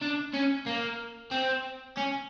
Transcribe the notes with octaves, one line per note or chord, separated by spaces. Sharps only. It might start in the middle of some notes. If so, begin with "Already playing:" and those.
D4
C#4
A#3
C4
C#4